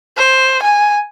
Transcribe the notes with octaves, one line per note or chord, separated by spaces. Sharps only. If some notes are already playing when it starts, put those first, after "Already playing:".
C5
G#5